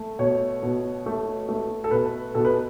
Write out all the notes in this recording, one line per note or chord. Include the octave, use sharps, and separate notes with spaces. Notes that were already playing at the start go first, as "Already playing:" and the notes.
Already playing: A3
B2 C#5
B2
A3
A3
A4
B2 B4
B2 A4
B4